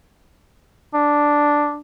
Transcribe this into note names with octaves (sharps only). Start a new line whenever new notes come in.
D4